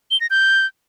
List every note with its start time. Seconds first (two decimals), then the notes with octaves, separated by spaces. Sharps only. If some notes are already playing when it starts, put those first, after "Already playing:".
0.11 G7
0.21 A#6
0.30 G6